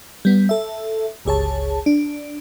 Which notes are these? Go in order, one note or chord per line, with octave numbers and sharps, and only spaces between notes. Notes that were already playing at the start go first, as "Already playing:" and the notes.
G3 B3
A4 E5
G1 C#2 G#4 C#5 A5
D4